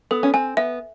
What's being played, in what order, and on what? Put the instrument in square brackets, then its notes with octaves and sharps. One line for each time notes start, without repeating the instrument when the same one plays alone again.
[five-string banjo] B3 [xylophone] A4
[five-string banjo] C#4
[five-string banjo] C4 [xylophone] G#5
[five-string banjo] B3 [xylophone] E5